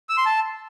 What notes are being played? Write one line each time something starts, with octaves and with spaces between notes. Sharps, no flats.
E6
C6
A5